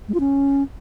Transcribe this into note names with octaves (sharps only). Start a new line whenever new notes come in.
G#3
F4
C#4